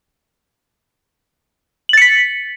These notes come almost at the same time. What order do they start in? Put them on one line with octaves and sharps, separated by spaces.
F#7 A6 C#7 B6